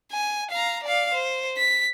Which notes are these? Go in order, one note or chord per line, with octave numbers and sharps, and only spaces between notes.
G#5
F5 A#5
D5 F5
C5
B6